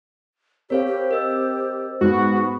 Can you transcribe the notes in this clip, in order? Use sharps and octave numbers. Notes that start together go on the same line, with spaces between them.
C4 G4 A#4 C#5 F5
G4
A#4 D#5 E6
G#2 B3 F#4